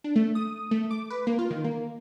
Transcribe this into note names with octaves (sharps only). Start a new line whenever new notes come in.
D4
A3
D#6
A3
D6
B4
A#3
F4
D#3
A#3